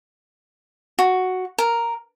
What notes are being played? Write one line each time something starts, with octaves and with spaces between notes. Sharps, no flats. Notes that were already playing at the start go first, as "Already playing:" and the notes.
F#4
A#4